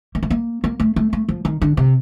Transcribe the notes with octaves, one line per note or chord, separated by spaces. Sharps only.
A#3
A3
A#3
A#3
A3
A3
A3
F3
D#3
D3
C3